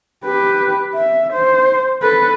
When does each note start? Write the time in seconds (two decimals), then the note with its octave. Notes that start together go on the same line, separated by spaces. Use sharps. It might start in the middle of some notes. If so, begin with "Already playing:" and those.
0.24 G4 B4
0.95 E5
1.33 C5
2.02 A4 B4